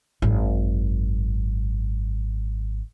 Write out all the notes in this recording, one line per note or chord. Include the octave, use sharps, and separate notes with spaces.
G#1 F#2